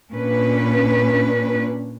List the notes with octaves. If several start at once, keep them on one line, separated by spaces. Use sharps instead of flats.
A#2 C#4 D4 B4